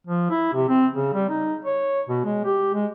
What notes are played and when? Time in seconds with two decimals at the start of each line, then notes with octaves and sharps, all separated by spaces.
0.07 F3
0.30 E4
0.53 C3
0.69 C4
0.94 C#3
1.14 G3
1.29 D#4
1.65 C#5
2.09 B2
2.24 G#3
2.45 G4
2.74 G#3